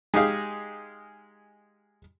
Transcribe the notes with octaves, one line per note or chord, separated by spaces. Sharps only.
G#3 D#4 G4 G#4 F5